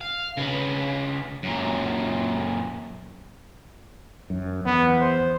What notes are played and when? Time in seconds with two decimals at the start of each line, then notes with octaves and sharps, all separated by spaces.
0.01 F5
0.37 C#3 B4
1.43 F#2 A#2
4.30 F#2
4.65 E2 B3
5.00 C5